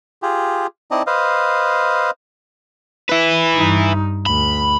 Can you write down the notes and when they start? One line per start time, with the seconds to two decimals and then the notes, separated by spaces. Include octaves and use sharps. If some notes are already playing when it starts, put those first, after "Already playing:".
0.22 F4 G4 G#4
0.91 C4 D#4 E4 D5 D#5 A5
1.07 B4 C5 D#5 F5
3.09 E4 B4
3.55 G2 D#4
4.26 D2 B5